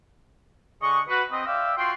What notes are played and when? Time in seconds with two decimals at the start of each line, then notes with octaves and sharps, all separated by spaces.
0.82 D3 G#4 D#5 C#6
1.09 F#4 B4
1.31 C4 D#5
1.46 D5 E5 F5 G5 E6
1.78 F4 F#4 G5 C6